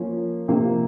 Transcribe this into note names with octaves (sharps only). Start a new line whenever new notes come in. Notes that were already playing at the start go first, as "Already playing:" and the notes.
Already playing: F3 A#3 C#4 F4
C3 F3 A#3